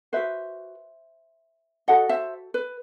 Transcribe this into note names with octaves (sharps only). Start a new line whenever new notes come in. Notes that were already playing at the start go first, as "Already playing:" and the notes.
F#4 B4 C5 E5
F#4 A4 D#5 F#5
C5 E5
B4